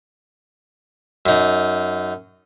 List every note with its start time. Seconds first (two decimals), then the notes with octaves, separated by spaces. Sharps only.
1.26 F#2 D#4